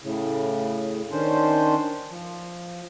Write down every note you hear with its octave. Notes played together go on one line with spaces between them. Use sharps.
A2 C#3
D#3 C#4 D4 C5
F3